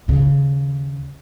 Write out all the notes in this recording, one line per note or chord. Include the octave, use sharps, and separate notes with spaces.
D#2 C#3